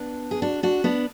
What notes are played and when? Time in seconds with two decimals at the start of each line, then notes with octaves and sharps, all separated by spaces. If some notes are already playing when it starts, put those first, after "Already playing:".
Already playing: B3 D4
0.31 G#4
0.42 D4 F#4
0.63 D4 F#4
0.84 B3 D4